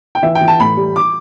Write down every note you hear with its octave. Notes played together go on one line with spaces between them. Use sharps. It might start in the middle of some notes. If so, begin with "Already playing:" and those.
G5
E3 E5
G5
E3
A5
A2 B5
G3
D6